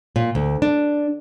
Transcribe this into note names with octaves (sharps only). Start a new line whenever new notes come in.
A#2
D2
D4